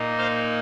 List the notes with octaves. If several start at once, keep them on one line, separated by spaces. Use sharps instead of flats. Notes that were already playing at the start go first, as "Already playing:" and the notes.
Already playing: A#2 A#3 D#4
C5 F5